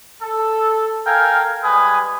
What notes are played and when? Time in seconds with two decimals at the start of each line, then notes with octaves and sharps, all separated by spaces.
0.22 A4
1.07 A4 A#4 F5 G5 G#5
1.64 G3 G#3 B4 G#5 D#6